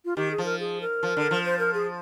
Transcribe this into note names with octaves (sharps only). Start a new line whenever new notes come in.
F4
D#3 G4
G#4
F3
A#4
G#4
A#4
F3
D3
F3
C5
A#4
G#4